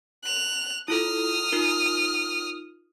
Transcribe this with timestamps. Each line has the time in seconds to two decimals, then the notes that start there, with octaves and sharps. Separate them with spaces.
0.24 F#6 F7
0.88 E4 F4 A4 D#6 F6
1.52 D#4 F4 A#4